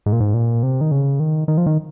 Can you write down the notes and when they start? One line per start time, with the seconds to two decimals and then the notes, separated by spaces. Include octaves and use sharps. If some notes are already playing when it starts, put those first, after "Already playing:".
0.06 G#2
0.12 A#2
0.20 G#2
0.34 A#2
0.63 C3
0.81 D#3
0.91 C#3
1.20 D#3
1.48 D#3
1.58 F3
1.66 D#3